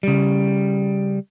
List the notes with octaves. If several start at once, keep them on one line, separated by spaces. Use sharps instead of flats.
C#3 G3